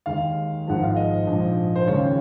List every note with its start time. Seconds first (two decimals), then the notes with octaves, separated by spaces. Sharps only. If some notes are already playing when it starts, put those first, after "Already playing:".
0.06 D#2 D#3 G#3 F5
0.67 G#1 G#2 F3 G#3 F#5
0.83 F5
0.96 D#5
1.27 A#1 G#2 F3
1.76 C5
1.87 D#2 C#3 F3 G#3 C#5